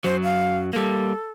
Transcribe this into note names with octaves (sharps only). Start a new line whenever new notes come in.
F#2 F#3 C5
F5
G3 A#3 A4